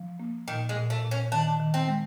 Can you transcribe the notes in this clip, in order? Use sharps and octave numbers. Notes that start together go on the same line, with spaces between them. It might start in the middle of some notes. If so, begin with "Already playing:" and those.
Already playing: F3
A#3
A#2 D#3
G#3
A#2
A3
A#2
C#4
D#3 D4
D#3
C4
G#3